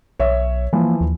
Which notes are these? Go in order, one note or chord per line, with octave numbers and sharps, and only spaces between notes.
B1 C#5 E5
E3 F3 A#3
D#2